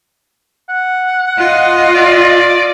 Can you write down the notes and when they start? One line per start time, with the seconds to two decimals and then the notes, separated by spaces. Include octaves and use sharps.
0.69 F#5
1.38 F4 D#5
1.94 D5